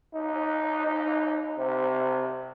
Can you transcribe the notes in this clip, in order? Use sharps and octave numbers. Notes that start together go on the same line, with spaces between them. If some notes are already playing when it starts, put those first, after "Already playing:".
D#4
D#4
C3